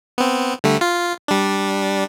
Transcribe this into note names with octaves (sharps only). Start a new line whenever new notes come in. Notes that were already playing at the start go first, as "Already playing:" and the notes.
B3 C4
D3 G3 A3
F4
G3 D4